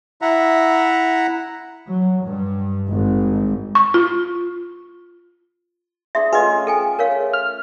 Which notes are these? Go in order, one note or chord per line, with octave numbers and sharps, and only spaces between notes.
E4 E5 F#5 A#5
F#3
G2
G#1
C#6
F4
D4 G#4 E5 C6
A3 C#4 F4 G#4 B4 D#5
A4 G5 G#5
A#4 C#5 F5
F6